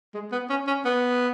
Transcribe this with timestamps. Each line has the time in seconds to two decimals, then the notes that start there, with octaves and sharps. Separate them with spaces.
0.14 G#3
0.32 B3
0.50 C#4
0.67 C#4
0.85 B3